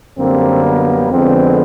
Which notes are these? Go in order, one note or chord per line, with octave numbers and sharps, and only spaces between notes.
F#2 D3 G3 A#3 C4
B3
F2 D3 F3 G#3 B3 C4